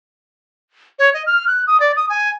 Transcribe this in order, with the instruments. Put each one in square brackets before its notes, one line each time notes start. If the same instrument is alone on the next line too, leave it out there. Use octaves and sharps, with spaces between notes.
[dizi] C#5
D#5
F6
F#6
D#6
D5
D#6
G#5